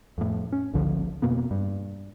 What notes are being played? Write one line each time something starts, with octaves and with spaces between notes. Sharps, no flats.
F2 A2
C#4
G#1 C#2 D3 F3
F2 B2 A#3 B3
G2